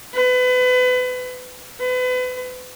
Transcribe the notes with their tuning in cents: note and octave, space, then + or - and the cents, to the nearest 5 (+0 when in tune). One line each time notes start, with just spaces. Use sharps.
B4 +30
B4 +35